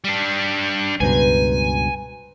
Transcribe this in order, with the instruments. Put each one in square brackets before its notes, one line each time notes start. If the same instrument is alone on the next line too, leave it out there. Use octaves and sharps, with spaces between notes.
[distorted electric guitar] G3 D4
[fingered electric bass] C#2 G2 B2 [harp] B4 C5 A#5 [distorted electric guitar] G#5